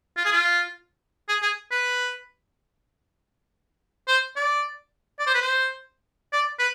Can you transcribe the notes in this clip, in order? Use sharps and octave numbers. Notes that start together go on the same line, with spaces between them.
F4
G#4
F4
G#4
G#4
B4
C5
D5
D5
C5
B4
C5
D5
B4